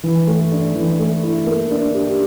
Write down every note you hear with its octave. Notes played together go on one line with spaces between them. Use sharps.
E3
A3
D4
E3
A3
E4
A#3
D4
G4